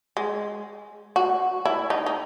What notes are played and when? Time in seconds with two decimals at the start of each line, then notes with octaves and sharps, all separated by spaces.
0.17 G#3
1.16 F#4
1.65 E4
1.90 D#4
2.06 D#4